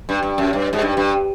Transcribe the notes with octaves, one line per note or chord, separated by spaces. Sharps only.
G2
G2
F#2
G2
G#2
G2
G2